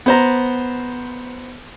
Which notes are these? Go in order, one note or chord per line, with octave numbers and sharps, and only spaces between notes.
B3 C5 A#5